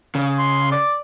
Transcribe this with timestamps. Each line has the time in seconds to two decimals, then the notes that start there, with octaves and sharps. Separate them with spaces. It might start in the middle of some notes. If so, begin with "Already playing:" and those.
0.15 C#3
0.39 C6
0.72 D5